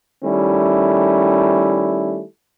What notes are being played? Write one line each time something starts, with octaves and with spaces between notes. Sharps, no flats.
D#3 G3 A3 C#4 E4